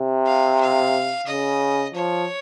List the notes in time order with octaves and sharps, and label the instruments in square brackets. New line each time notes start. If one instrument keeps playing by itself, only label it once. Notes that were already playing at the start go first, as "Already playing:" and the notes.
Already playing: [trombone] C3
[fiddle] F5
F5
[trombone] C#3 [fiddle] D#5
[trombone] F3 [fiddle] C#5